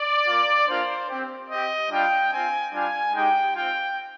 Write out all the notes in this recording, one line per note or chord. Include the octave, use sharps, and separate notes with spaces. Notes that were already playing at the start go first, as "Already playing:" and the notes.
Already playing: D5
A#3 F4
A#3 D4 F4 C5
C4 G4
C4 G4 D#5
G3 D4 F4 G5
C4 F4 G#5
G3 D4 F4 G#5
G#3 D#4 G4 G5
C4 F4 G5